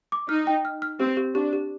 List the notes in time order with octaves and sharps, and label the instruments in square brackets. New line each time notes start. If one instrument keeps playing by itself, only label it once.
[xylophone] D6
[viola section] D#4 [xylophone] F6
[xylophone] G5
F6
F6
[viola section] C4 [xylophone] G4
[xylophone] G4
[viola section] D4 [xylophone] G4
[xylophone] G4